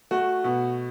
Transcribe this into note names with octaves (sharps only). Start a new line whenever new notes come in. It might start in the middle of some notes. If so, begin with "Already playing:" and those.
A3 F#4
B2